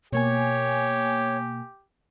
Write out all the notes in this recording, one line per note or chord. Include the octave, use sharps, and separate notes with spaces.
B2 A#3 G4 C#5 G#5